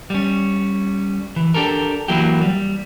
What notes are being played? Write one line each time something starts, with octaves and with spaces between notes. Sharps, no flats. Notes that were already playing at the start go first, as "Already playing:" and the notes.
G3 C#4
E3
D4 G4 A4 A#4
E3 F#3 A#3 E4 G4
G3